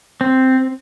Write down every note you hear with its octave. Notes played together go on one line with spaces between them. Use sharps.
C4